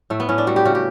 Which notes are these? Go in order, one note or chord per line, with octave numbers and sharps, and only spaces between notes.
A2 A3
B3
A2 C#4
D4
G3 F#4
G4
C#3 F#4
G4